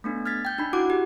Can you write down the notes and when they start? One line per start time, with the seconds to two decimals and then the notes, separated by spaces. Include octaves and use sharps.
0.04 A3 B3 D4
0.26 F6 G#6 A6 B6
0.45 G5 G6
0.58 D4 D#4 B5
0.73 E4 F#4 F#5 D6
0.90 G4